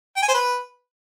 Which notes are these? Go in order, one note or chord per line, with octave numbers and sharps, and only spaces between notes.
G5
G#5
C5
B4